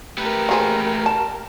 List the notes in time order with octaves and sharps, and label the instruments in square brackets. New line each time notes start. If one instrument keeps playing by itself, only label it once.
[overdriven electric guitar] A3 B4 [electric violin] G4 A#4
[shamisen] A#3 G#4 C5
A5